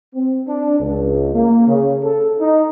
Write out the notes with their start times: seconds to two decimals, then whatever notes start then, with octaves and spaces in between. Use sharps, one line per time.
0.14 C4
0.47 D4
0.80 C#2
1.34 A#3
1.66 C#3
2.02 A4
2.39 D#4